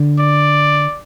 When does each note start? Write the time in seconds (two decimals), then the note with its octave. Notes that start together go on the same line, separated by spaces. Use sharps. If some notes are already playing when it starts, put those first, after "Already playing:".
Already playing: D3
0.19 D5